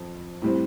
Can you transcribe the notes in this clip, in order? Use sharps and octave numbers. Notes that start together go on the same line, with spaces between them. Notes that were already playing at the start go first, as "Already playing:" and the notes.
Already playing: F2
A2 G3 C4